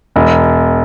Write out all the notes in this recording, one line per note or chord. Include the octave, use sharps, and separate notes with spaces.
E1